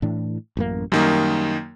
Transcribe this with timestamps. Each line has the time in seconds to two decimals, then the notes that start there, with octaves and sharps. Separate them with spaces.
0.02 A2 E3 D4
0.57 A1 F#2 A#3
0.92 F#2 D#3 G3 A#3